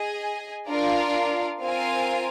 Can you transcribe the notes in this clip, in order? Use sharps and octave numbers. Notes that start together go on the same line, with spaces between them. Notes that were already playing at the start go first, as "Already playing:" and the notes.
Already playing: G#4 D#5 G#5
D4 F4 A#4 D5 F5
C4 F4 A#4 F5 G#5